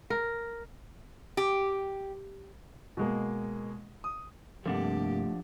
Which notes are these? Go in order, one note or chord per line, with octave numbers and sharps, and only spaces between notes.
A#4
G4
B2 G#3 A#3
D#6
G2 C3 F3 A3 A#3 D4 G4 F#5